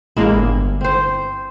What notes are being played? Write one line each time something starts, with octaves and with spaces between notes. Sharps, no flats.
A1 G#3 A#3 E4
G1
C4 C5